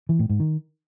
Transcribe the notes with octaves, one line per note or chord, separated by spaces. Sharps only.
E3
A2
G#2
D#3